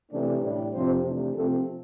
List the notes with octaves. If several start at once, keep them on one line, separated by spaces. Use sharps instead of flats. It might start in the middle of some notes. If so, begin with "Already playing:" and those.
C3 E3 A3 D4
A2 G3 D4
F2 C3 F3 C4 C5
C3 E3 A3 D4
C3 F3 A3 C4 A4